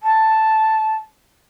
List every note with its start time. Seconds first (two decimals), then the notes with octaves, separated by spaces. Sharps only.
0.03 A5